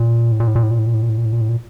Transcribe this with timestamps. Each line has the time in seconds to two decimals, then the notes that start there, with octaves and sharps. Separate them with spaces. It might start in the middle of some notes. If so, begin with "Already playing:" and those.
Already playing: A#2
0.32 A2
0.40 A#2
0.48 A2
0.55 A#2
0.63 A2
0.71 A#2
0.79 A2
0.86 A#2
0.94 A2
1.02 A#2
1.09 A2
1.18 A#2
1.25 A2
1.33 A#2
1.41 A2
1.49 A#2